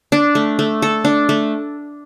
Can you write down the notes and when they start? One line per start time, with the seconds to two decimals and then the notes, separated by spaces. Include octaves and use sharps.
0.12 D4
0.35 A3
0.59 A3
0.82 A4
1.05 D4
1.29 A3